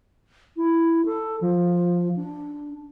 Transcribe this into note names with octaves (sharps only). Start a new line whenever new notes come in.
E4
A4
F3
D4